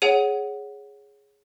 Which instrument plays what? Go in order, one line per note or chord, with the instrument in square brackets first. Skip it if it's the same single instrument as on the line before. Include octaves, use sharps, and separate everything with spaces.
[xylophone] G#4 C#5 F#5 D#7